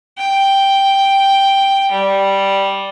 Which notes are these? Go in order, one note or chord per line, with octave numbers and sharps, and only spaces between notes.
G5
G3